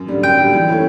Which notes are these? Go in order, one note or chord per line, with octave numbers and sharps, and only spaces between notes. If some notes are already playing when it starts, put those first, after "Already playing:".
Already playing: F#2
D3 G3
F#2 G5
D3 G3
E3
A3 C#4 E4